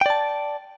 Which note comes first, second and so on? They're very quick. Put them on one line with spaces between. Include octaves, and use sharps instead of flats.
G5 D5 A5